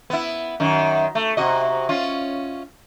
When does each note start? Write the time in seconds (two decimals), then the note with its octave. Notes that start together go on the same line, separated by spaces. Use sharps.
0.10 B3 E4
0.60 F#2 D#3
1.15 A3
1.37 C3 F#4 D#5
1.89 C#4 F4